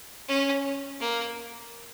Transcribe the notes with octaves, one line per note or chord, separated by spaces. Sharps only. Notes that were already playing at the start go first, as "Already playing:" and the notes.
C#4
A#3